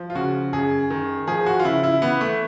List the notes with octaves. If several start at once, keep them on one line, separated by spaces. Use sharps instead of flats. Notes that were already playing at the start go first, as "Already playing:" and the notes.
Already playing: F3
F4
C#3 F#4
F#2 G#4
D#3
F3 G#4
F#4
F4
C#3 E4
E4
E3 B3
A3